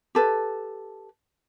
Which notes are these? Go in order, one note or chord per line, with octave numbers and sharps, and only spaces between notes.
G4 A4 B4